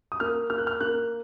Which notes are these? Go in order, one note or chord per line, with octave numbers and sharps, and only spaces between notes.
D#6
A#3 F6
A#3 F6
F#6
F6
A#3 F#6